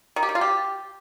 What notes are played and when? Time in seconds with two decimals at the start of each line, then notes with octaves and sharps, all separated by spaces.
0.16 D#3
0.23 G4
0.29 D#3
0.35 F4
0.41 G4